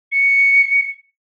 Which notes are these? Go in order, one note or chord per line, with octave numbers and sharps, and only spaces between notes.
C#7